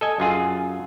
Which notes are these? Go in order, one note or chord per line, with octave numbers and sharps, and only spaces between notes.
A4 D#5 G#5
F#2 F4 G#4